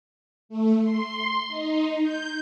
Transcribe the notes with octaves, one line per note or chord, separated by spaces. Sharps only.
A3
C6
D#4
G6